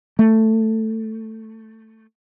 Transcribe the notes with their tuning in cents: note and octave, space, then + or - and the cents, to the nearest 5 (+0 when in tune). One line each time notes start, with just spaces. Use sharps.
A3 +10